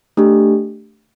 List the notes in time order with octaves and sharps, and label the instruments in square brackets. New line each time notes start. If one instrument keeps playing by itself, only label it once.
[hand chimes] A3 D4 G4